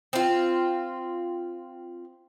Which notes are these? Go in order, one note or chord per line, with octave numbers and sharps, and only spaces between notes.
C4 F4